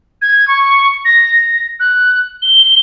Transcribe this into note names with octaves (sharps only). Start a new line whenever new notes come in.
G#6
C#6
A#6
F#6
G7